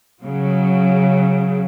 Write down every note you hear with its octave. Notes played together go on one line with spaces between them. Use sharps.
C#3 F#3